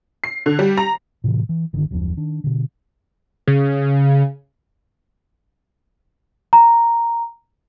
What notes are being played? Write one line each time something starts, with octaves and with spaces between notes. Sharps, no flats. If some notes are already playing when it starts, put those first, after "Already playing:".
C7
D3
G3
A#5
A2 C3 E3
E3
G1 D3 D#3
F#1 D#2 F3
D#3 D4
B2 D3
C#3
A#5